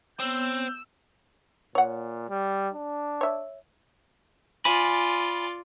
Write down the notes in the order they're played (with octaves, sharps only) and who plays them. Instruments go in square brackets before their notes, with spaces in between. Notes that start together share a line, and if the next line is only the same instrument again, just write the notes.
[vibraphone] B3 C#5 [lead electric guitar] C4 [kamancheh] E6 [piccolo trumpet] G6
[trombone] A#2 [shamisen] C#5 F#5
[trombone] G3
D4
[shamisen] C#5 E5
[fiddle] F4 D5 [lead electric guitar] G#5 B5